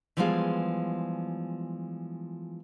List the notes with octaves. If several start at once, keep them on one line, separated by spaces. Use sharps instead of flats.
E3 F3 G3 G#3 B3 F4